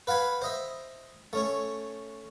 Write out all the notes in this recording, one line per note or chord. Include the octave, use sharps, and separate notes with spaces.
B4 F5 F#5 G#5 B5
C5 D#5 E5
A3 C#4 C#5